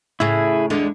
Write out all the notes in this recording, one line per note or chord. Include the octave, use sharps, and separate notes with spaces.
A2 C#3 E4 G#4
E2 D3 G#3